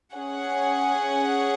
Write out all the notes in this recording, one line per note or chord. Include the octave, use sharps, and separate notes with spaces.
C#4 G#4 C#5 F#5